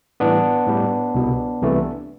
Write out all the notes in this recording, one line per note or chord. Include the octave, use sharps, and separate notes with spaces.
A2 E3 G3 B3 D4
A2 G3
C2 B2 G3
C2 C3 E3 A3